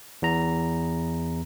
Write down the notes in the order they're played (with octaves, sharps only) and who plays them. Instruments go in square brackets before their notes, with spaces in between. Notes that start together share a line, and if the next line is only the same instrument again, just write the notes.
[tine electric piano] E2 A#5